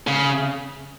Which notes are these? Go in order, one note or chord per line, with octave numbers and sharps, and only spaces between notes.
C#3